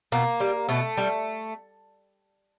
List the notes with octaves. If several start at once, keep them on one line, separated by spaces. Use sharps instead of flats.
B2 A#3
G3
B2 A3
G3